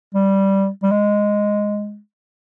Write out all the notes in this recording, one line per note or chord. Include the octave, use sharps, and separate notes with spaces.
G3
G3
G#3